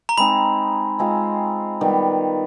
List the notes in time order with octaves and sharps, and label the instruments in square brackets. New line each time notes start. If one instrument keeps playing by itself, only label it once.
[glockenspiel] A#5
[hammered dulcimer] G#3 C4 D#4 [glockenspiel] B5
[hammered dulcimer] G#3 C4 F4
D#3 G3 B3